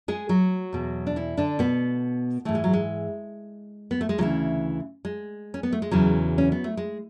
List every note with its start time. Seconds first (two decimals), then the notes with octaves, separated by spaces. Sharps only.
0.08 G#3 G#4
0.29 F#3 F#4
0.73 E2 B2
1.07 D4
1.16 E3 E4
1.37 D3 D4
1.59 B2 B3
2.45 G#2 E3 A3
2.55 G#3
2.64 F#3
2.73 G#3
3.91 B3
4.01 A3
4.09 G#3
4.18 D2 C#3 E3 F#3
5.05 G#3
5.54 C#4
5.63 B3
5.73 A3
5.82 G#3
5.91 E2 C#3 E3 F#3
6.38 C#4
6.52 B3
6.64 A3
6.77 G#3